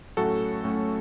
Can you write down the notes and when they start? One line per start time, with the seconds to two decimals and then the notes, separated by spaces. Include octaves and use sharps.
0.17 A2 F#3 A3 C#4 F#4 A4
0.64 A2 F#3 A3 C#4